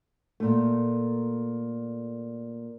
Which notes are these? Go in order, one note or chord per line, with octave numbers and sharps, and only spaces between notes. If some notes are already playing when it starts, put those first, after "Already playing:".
A#2 A3